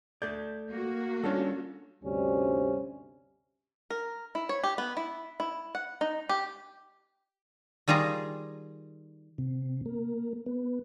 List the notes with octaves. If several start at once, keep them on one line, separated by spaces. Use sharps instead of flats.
A3 A4 D5 G6 G#6
A#3 F#4
G3 C#4 D4 F4 A4
D2 G2 C3 G3 C#4
A#4
E4
C#5
G4
B3
E4
E4
F#5
D#4
G4
D#3 G3 F4 G#4 A#5
C3
A#3
B3